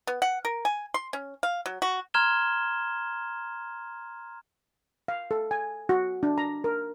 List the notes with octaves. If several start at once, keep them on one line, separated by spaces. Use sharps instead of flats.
B3
F#5
A#4
G#5
C6
C#4
F5
F#3
F#4
A#5 C6 F6 G#6 E7 G7
F5
A4
G#5
F#4
D4
A#5
A#4